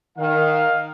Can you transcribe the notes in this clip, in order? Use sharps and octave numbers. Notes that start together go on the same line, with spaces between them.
D#3 F5